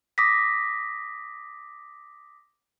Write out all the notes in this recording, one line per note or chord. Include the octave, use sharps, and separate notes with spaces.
D6 D#6 A#6 B6